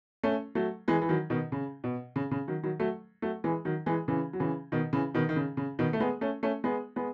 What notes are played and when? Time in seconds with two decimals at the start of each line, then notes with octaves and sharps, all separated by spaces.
0.23 A3 C#4
0.55 F#3 A3
0.88 E3 G#3
1.02 E3
1.09 D#3 F#3
1.30 B2 D#3
1.52 C#3
1.84 B2
2.16 C#3
2.31 C#3
2.48 D#3 F#3
2.63 D#3 F#3
2.80 F#3 A3
3.22 F#3 A3
3.44 E3 G#3
3.65 D#3 F#3
3.86 E3 G#3
4.08 C#3 E3
4.33 F#3
4.40 C#3 E3
4.72 B2 D#3
4.93 C#3 E3
5.14 B2 D#3
5.29 D#3
5.36 C#3
5.57 C#3
5.79 B2 D#3
5.93 A3
6.00 G#3 B3
6.21 A3 C#4
6.43 A3 C#4
6.64 G#3 B3
6.96 G#3 B3